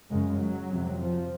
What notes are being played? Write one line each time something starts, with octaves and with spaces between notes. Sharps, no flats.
F#2 C#3 G#3
F#3
F2 C3
F3